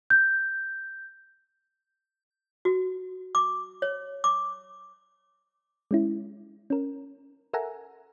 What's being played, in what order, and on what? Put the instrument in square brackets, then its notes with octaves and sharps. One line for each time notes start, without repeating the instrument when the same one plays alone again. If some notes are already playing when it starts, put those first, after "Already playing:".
[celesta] G6
[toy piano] F#4
D6
C#5
D6
[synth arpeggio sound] G#3 C#4 E4
C#4 A#4
A4 A#4 E5 F#5 G#5 A#5